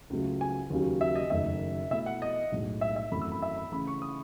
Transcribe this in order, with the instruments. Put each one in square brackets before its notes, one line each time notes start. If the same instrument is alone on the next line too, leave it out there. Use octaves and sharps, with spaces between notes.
[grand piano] C#2 C#3 F#3 A3
[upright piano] G#5
[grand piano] D#2 C#3 F#3
[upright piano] E5
D#5
[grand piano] F#1 F#2 D#3 A3 [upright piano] E5
[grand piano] B2 A3 E4 [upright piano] E5
[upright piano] F#5
D#5
[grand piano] B1 A2 G#3
[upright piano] E5
E5
[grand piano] G#1 F#2 E3 A3 E4 [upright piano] B5
[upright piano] E6
B5
E5
B5
[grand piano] C#3 E3 A3 [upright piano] B5
[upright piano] C#6
D#6